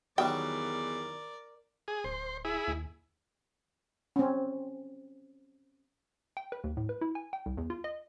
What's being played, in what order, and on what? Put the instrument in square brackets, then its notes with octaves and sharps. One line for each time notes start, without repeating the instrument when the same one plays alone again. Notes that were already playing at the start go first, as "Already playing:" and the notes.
[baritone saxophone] E2 [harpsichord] D#3 F#3 G3 [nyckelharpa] A#4 D5 [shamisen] G5
[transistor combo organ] G#4
[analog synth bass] D1 [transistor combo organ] C5
[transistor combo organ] E4 G#4
[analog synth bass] D#2
[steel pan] C4 C#4
[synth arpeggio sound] G5
B4
D#2
A2
B4
E4
G#5
G5
C2
E2
F4
D#5